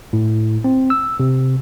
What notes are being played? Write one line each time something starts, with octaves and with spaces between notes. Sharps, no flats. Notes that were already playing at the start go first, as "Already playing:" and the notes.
A2
C4
E6
C3